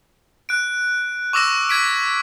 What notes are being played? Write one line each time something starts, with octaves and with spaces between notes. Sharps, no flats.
F#6 D7
C#6 D6 E6 A#6 E7
G#6 B6 D7